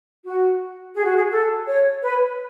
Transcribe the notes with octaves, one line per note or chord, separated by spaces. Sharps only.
F#4
G#4
F#4
G#4
A4
C#5
B4